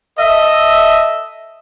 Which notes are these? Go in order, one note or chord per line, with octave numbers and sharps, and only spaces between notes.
A4 D#5 E5